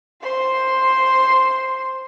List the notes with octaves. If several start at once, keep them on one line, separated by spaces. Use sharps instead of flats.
C5 C6